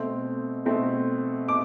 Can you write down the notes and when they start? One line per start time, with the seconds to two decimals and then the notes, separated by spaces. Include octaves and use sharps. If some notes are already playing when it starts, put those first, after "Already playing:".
Already playing: B2 A3 C4
0.66 B2 A3 C4
1.49 B2 D6